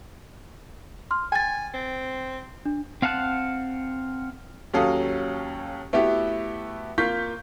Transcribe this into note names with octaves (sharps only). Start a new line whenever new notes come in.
C6 F6
G5 G#5 A6
C4
D4
C4 F5 F#5 A5 F#6
D#2 F#3 C#4 A4 F5 D#6
A3 B3 E4 F#4 G4
A#3 F4 C#6 G6 B6